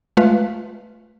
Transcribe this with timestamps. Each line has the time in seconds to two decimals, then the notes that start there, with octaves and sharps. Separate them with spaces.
0.17 G#3 A3 F4 B4 F5